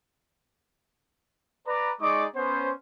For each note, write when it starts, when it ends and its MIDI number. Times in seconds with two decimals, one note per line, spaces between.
1.67 1.92 71
1.67 1.92 74
1.67 1.92 82
2.01 2.25 56
2.01 2.25 63
2.01 2.25 68
2.01 2.25 74
2.01 2.25 85
2.01 2.25 86
2.36 2.72 59
2.36 2.72 61
2.36 2.72 72